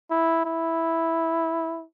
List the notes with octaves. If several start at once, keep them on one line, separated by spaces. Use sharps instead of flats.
E4
E4